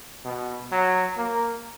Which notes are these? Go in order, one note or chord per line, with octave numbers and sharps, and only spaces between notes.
B2
F#3
A#3